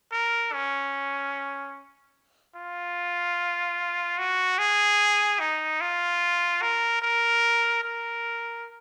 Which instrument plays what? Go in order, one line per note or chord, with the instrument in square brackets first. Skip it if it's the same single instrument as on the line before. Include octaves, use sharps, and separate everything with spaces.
[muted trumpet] A#4
C#4
F4
F#4
G#4
D#4
F4
A#4
A#4
A#4